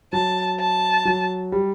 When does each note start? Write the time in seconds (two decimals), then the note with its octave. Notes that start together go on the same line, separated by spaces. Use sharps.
0.13 F#3 A5
0.60 A5
1.05 F#3
1.52 G3